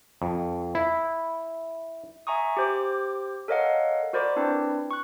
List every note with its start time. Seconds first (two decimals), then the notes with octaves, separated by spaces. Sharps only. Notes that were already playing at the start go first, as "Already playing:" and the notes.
0.22 F2
0.75 E4
2.27 E5 G#5 A#5 C#6 D#6
2.57 G4 C5 D6
3.48 A4 A#4 C#5 D#5 F5 F#5
4.13 F#4 A#4 C5 D5 B5 D6
4.36 C4 D4 E4 B4
4.91 C#6 F#6